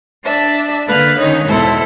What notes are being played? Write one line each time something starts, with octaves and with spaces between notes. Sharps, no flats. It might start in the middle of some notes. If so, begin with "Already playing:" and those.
D4 D5 E5 A5
D3 A#3 B4 F5
D#3 C#4 D#4 C#5
E2 B2 G#3 E4 A4 C5